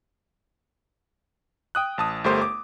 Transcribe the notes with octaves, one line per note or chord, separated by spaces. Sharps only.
G5 D#6 F#6
A1 A5 D#6
G1 A3 G4 A#4 C5 C6
D6